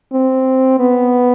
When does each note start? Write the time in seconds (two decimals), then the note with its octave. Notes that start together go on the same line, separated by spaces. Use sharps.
0.13 C4
0.80 B3